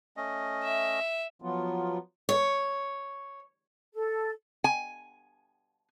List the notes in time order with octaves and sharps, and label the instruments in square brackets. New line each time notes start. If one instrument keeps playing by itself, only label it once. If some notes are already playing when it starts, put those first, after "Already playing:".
[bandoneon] A3 C#4 D#5
[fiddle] E5
[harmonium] F3 F#3 B3 F4
[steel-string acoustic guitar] C#5
[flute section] A4
[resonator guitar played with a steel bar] G#5